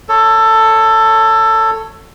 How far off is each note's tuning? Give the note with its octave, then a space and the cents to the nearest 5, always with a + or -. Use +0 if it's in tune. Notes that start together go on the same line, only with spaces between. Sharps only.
A4 +15 C#5 +0